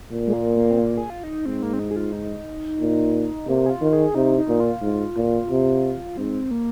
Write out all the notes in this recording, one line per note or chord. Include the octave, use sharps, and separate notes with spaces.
A#2
G#3
A#3
A#3
C4
A#3
G#4
F4
D#4
G#2 C4
A#3
C4
D#4
G#4
F4
D#4
A#2
C3 A#3
G#4
F4
D#3
G#4
C3 D#4
D#4
A#2
F4
G#2
A#2
C3
G#2 C4
A#3